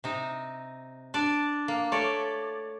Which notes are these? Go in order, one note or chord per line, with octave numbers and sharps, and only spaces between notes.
C3 D#4
D4 D5
A#3
A3 C#5 D5